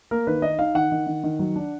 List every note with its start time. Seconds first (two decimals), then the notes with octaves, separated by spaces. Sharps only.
0.11 A#3 A#4
0.27 D#3 B4
0.42 D#4 D#5
0.59 D#4 F5
0.75 D#3 F#5
0.92 D#3
1.07 D#3
1.24 D#3
1.39 F#3
1.56 D4